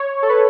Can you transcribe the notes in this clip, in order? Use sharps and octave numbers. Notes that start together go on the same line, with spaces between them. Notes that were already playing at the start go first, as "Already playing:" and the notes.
Already playing: C#5
A4
B4